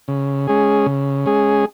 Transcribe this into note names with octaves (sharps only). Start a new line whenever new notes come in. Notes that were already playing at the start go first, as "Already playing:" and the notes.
C#3
G#3 C#4 G#4
C#3
G#3 C#4 G#4